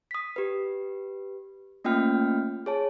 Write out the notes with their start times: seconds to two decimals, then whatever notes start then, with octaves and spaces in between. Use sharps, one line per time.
0.11 D#6 B6
0.36 G4 B4
1.84 A3 A#3 C#4 F4 G5 F6
2.66 G#4 C#5 A5